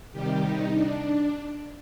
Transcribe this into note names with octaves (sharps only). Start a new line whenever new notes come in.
C3 D#3 G3 G4
D#4
D4